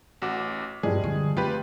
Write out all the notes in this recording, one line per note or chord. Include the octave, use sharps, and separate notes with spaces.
A1 F#4 D6
G2 F3 G3 G#3 G#4
D3
A3 F4 G4 B4